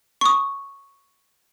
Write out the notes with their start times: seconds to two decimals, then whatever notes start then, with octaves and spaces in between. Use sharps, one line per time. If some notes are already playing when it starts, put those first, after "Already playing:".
0.21 C#6 D#6